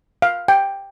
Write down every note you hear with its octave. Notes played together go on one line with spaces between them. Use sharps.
F5
G5